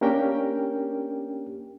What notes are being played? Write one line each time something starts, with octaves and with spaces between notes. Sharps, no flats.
A#3 C#4 D4 G4 A#4 G5